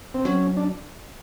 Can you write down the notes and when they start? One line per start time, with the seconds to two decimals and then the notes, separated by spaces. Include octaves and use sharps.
0.14 C4
0.25 F#3 C#4
0.57 D4